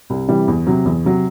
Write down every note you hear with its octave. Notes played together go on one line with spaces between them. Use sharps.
C2
C3 E3 G3
E2
C3 F#3
E2
C3 F#3